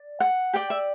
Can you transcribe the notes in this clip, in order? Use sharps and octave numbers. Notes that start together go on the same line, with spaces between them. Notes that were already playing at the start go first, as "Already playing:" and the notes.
Already playing: D5
F#5
G4 D5 G5
E5